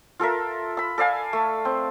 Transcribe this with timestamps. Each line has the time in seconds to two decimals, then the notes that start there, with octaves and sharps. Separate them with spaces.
0.20 F4 A4 A#4 E5
0.77 B5 E6
0.98 A4 D5 F5 G#5
1.33 A3
1.65 C4